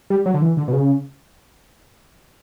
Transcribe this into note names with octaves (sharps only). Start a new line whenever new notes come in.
G3
F#3
D3
E3
D3
B2
C#3